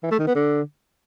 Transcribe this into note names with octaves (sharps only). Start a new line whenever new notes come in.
E3
A3
D#3
B3
D3